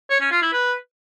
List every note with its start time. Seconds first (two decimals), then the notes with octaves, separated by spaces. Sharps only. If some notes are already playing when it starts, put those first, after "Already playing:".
0.10 C#5
0.21 C#4
0.31 F4
0.42 E4
0.53 B4